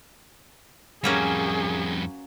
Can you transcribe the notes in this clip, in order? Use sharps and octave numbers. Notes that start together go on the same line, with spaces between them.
F2 F#3 G3 A#3 C#4 G#4